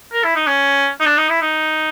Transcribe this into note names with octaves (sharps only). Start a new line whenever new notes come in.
A#4
E4
D#4
C#4
D#4
D4
D#4
E4
D#4